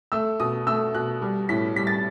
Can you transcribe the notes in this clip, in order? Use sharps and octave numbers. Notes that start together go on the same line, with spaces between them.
A3 E6
B2 D#6
A3 E6
B2 F#6
G3
A2 B6
G3 B6
A6